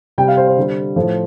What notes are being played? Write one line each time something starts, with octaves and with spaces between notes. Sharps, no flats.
C3 G3 G5
F5
C5
C5
D3 G3
A2 F3 A3 C5